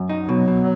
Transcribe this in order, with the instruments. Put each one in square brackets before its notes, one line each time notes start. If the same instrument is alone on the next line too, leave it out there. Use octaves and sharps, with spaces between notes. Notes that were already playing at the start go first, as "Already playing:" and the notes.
Already playing: [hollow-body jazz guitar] F#2
D#4
[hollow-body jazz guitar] B2 [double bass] F#3
[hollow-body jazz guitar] B2